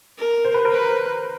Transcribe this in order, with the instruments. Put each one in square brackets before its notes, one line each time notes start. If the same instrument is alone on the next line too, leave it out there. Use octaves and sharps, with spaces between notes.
[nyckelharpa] A#4
[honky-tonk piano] C5
B4
A#4 C5
[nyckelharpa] B4